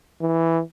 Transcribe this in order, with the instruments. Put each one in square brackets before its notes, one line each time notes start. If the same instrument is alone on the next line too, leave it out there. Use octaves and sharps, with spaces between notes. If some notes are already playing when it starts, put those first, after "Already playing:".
[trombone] E3